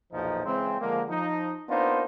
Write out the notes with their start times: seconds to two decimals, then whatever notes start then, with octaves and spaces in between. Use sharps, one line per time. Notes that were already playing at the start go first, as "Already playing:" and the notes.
0.13 B1 E2 A#2 F3 D#4
0.46 C#3 E3 G#3 C4
0.81 D3 F3 G#3 A#3
1.09 F3 D#4
1.69 A#3 B3 D4 D#4 F4 C5